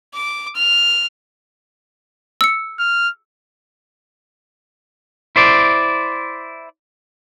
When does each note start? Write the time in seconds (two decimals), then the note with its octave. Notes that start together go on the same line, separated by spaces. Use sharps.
0.15 D6
0.56 F6
2.41 E6 C#7
2.79 F6
5.36 E4 C5 D5